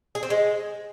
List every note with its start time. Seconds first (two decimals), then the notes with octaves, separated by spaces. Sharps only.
0.15 G#4
0.23 C4
0.30 G#3